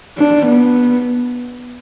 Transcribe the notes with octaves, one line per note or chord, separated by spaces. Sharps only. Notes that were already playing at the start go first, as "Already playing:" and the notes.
D4
B3